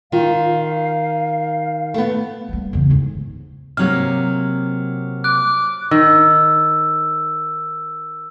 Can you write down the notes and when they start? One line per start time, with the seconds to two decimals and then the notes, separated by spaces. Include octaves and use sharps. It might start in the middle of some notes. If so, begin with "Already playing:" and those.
0.12 D#3 F4 F5
1.94 A3 B3
2.49 G3 A#3
2.73 E2 C#3
2.90 D2 G#2
3.77 C3 F#3 A#3 F6
5.24 D6 F#6
5.91 D#3 E6